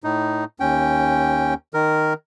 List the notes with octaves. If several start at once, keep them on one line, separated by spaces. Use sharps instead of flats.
A2 D#4
D#2 C#4 G5
D#3 A#4